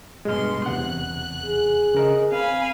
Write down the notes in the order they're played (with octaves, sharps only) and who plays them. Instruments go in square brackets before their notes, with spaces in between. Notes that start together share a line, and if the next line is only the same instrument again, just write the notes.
[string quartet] G2 B2 C6 [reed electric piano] G#3 F6
[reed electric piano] E2 C3 F#5 [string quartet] F#6
[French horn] G#4
[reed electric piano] C#3 A#4 D#5
[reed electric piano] C4 [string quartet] F5 G#5 B5